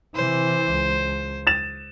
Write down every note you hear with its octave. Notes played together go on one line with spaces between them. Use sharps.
C3 E3 C5
C#2
A6 E7